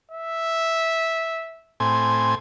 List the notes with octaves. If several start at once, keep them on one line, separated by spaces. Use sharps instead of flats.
E5
A2 C4 G#5